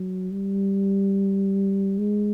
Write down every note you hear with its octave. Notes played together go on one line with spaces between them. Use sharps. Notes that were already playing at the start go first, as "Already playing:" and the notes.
Already playing: F#3
G3
G#3